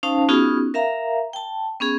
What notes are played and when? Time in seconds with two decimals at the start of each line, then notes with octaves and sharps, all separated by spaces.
0.03 C#4 D#4 C5 F5 A5
0.29 B3 C#4 D#4 F4 F#4 G#4
0.74 A#4 E5 F5 A#5
1.33 G5 A5
1.80 B3 C#4 G#4